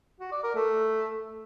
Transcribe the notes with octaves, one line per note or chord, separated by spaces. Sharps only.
F#4
D5
A#4
A3